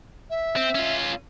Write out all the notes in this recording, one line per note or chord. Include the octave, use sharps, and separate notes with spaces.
E5
C4
C#4 F4